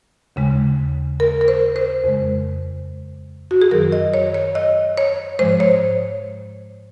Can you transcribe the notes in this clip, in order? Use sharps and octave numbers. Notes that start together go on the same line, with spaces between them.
D#2 C#3 G#3
A#4
A#4
C5
C5
F2 C#3 G#3
F#4
G#4
F#2 D#3 F#3 A#4
D#5
C#5
C#5
D#5
C#5
G#2 F3 G#3 C5
C#5